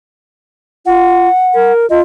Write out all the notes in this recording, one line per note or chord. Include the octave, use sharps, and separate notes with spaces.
F4 F#5
A#4
F4 D#5